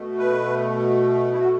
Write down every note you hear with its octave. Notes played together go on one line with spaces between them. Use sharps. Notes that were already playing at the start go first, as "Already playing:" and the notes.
Already playing: B2 A3
B4
E4
F#4